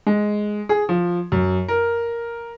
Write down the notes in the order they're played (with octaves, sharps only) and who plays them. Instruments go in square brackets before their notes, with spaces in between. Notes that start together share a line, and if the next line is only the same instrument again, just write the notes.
[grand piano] G#3
G#4
F3
F#2
A#4